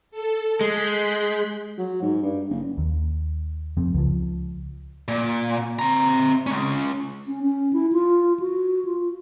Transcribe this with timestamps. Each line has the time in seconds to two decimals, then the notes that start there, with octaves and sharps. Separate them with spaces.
0.11 A4
0.61 G#3 F#6 G6 B6
1.78 F#3
2.02 G#2
2.22 G2
2.50 F#1
2.78 D#2
3.77 F1 F2 C4
3.94 C#2 F3
5.08 A#2
5.79 C4 A#5
6.47 G#3 C#4
7.27 C#4
7.43 C#4
7.73 E4
7.92 F4
8.40 F#4
8.85 F4